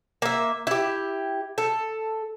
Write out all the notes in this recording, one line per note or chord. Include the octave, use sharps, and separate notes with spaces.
A#3 E5
E4 G4
A4